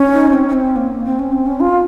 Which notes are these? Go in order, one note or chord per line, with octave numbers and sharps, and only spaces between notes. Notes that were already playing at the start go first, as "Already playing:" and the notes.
Already playing: C#4
D#4
C4
C#4
C4
A#3
C4
C#4
C4
C#4
F4